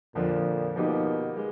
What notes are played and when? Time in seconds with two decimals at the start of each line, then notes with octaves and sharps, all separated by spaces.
0.15 F2 A#2 D3 F3
0.76 B2 F3 A#3 D#4 G4
1.37 G#3